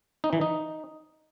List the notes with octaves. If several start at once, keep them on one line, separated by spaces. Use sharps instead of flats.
D#4
E3
D#4